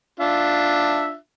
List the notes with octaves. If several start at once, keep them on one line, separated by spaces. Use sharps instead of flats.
D4 F4 E5